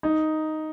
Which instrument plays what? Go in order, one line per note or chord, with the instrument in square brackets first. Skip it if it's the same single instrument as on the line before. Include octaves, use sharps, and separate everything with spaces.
[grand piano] D#4